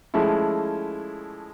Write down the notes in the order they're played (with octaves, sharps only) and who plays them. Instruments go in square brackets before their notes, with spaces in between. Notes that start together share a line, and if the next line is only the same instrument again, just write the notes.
[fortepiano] F3 G#3 A3 C#4 E4